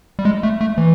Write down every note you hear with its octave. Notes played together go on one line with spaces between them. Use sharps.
G3
G#3
A3
A3
E3